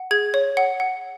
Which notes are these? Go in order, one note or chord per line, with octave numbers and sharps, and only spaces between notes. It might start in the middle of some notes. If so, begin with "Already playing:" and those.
Already playing: F#5
G#4 G#6
C#5
F#5
F#5